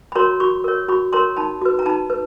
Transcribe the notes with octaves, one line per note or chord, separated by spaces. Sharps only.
B5
F#4 A#4 C#5 A#5 C6
F#4 B5 C#6
A#4 C#5
F#4 B5 C#6
A#4 C#5 A#5 C6
D#4 A5 B5
F#4 B4
A#5
D#4 A5 B5
B4